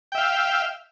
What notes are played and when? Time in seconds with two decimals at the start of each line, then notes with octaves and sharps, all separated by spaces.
0.12 G5
0.15 E5
0.18 F5